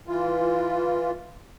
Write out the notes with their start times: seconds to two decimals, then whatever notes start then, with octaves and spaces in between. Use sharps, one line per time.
0.07 E3 F4